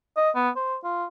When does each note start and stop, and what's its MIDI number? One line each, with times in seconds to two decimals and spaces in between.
0.17 0.30 75
0.35 0.50 59
0.56 0.76 72
0.84 1.05 65